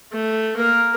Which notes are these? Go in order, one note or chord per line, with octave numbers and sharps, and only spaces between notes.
A3
A#3 A#4